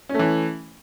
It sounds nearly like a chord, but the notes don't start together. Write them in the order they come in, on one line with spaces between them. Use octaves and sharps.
C#4 A3 E3